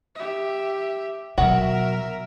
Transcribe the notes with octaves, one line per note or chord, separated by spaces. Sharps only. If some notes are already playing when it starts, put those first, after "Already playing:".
G4 E5
B2 F#3 F#4 A#4 E5 F#5